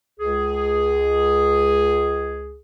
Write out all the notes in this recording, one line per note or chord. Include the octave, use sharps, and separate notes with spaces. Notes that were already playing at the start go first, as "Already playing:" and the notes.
C#2 G#4